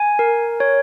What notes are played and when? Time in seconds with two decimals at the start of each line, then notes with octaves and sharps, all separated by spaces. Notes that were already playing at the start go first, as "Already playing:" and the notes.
Already playing: G#5
0.19 A#4
0.60 C#5